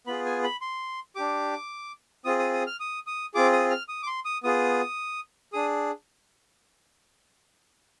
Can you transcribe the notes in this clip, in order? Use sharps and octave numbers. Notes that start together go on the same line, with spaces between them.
B3 F4 G#4 B5
G#5
B5
C6
D4 G4 D6
C4 F4 G#4 D#6
D#6
D#6
F6
D#6
D#6
C4 F4 G#4 D6
D#6
F6
D#6
D6
C6
D#6
B3 F4 G#4 D#6
D4 G#4 D#6